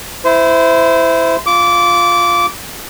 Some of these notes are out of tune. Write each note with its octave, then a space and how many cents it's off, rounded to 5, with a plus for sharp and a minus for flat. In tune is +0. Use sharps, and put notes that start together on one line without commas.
E4 +0 C5 -25
F4 +0 D6 -20